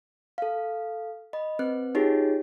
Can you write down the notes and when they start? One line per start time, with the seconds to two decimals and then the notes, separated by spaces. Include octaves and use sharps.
0.38 A4 F5
1.33 D#5 B5
1.59 C4 B4 F#6
1.95 D#4 F4 G4 G#4 C#5